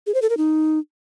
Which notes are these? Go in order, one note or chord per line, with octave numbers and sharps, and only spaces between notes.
G#4
C5
A4
A#4
D#4